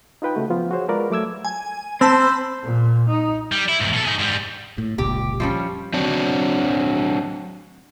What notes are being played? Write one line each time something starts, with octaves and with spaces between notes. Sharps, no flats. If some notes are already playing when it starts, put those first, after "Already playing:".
D#4 F4 B4 G5
C#3 A3 F#4
F3 B3 F4
F#4 G#4 C5 C#5
G#3 F4 A#4 B4 D5
F#3 A3 D6 E6 G#6
G#5
C4 C5 A5 B5 E6
A#2
D#4
G3
E4
E2 G#2
B2 A4
D#4 G#4
G#2 G3
A2
F1 C#2 A#2 G4
F3 G3 C#4
F#3 C4 D4 F#4